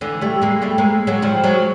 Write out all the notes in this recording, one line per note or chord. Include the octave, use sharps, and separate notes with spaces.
D3 E3
G3 A3
G#3 A#3
G3 A3
G#3 A#3
F#3 G#3
F3 G3
F#3 G#3